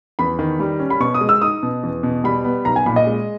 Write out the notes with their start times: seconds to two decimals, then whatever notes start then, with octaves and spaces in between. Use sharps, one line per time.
0.19 E2 B5
0.39 D#3
0.60 G3
0.80 C#4
0.90 B5
1.00 B2 C#6
1.14 D#6
1.21 G#3
1.29 E6
1.42 D#4 D#6
1.63 B2
1.83 E2
2.03 B2
2.24 G3 B5
2.44 B3
2.65 B1 A#5
2.76 G#5
2.86 A#2 B5
2.96 D#5
3.07 G#3